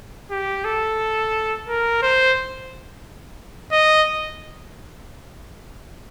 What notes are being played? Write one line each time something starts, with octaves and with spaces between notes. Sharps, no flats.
G4
A4
A#4
C5
D#5